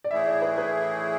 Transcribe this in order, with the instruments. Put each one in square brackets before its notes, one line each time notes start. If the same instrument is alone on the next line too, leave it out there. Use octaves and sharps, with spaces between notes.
[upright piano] D5
[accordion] A2 E3 A3 E4 G#4 [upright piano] E5
[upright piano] D5
B4
B4